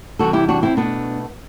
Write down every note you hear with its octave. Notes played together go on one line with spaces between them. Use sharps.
E2 C3 E3 G3 F#4 A4
E4 G4
D4 F#4
C4 E4
B2 A3 B3 D4